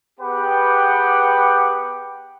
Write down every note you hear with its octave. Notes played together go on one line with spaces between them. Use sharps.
B3 G4 G#4 B4 F#5 G5